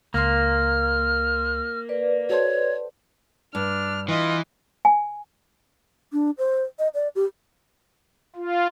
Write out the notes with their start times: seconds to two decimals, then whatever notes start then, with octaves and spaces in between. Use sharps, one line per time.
0.14 C#2 A#3 C6 F6
1.89 B4 D5
2.30 F#4 A4 C5 C#5
3.55 G2 D4 F6
4.09 E3 F4 D#5
4.85 G#5
6.13 D4
6.38 C5
6.79 D#5
6.94 D5
7.16 G4
8.36 F4